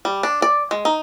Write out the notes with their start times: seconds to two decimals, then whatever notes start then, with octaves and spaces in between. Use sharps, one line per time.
0.05 G3
0.23 D4
0.42 D5
0.71 G#3
0.85 D#4